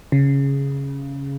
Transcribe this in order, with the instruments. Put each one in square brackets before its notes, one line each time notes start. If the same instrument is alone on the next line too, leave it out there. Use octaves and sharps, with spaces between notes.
[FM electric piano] C#3